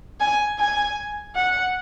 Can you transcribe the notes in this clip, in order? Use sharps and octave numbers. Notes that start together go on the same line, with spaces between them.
G#5
G#5
F#5